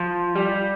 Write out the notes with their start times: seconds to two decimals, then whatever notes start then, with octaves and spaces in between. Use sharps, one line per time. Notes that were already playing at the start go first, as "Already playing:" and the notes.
Already playing: F3
0.36 G3